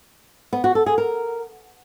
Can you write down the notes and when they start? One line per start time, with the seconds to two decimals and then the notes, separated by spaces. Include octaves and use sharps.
0.53 B3
0.64 F#4
0.75 A4
0.86 G#4
0.98 A#4